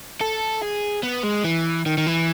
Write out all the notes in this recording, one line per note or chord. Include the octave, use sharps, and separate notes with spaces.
A4
G#4
B3
G#3
E3
D#3
D#3
E3